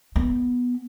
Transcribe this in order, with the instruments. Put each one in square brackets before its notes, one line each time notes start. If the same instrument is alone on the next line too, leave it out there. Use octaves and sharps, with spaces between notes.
[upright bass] B3